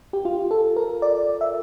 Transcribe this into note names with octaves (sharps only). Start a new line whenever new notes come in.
G4
F4
A4
A#4
D5
E5